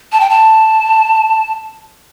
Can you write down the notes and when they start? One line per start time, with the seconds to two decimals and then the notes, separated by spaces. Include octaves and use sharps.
0.12 A5
0.21 G5
0.30 A5